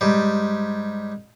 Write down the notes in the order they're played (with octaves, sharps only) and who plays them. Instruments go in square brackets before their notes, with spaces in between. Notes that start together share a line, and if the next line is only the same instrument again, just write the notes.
[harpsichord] G#2 G3